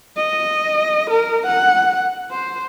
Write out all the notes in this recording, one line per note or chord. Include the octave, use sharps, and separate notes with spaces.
D#5
A#4
F#5
C5